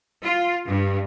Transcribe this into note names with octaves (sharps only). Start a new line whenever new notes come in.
F4
G2